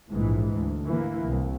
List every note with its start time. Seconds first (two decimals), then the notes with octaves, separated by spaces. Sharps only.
0.10 A#1 G#2 E3
0.55 D2
0.85 E3 A#3
1.27 C2